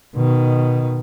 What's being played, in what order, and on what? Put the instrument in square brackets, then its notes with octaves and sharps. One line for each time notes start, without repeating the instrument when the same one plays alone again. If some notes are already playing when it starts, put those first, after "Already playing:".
[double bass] B2 D#3